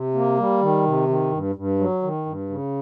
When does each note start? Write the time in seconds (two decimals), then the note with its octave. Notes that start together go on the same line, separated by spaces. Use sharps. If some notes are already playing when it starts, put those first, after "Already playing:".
Already playing: C3
0.15 A#3
0.38 G3
0.62 D#3
0.85 C3
1.09 D#3
1.32 G2
1.55 G2
1.79 F#3
2.03 D#3
2.26 G2
2.49 C#3